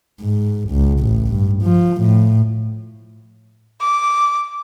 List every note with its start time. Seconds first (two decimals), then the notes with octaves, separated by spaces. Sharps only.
0.21 G#2
0.70 C#2
1.00 A1
1.32 G2
1.63 F3
2.02 A2
3.81 D6